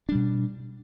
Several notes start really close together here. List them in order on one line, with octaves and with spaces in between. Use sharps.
D4 G3 B2